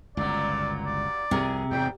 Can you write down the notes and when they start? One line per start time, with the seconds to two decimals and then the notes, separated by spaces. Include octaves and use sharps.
0.17 G1 C#2 G2 A#2 F#3 D5
0.85 D5
1.31 C2 F2 C3 G#4 A#4
1.71 E2 G#2 B2 F#3 G3 G5